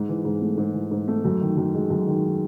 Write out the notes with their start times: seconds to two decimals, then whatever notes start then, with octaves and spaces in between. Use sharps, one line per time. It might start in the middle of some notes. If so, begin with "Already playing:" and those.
Already playing: G#2
0.09 E3
0.25 G#2
0.41 A3
0.58 G#2
0.75 E3
0.92 G#2
1.08 A3
1.25 F#2
1.41 D#3
1.57 F#2
1.75 G#3
1.90 F#2
2.07 D#3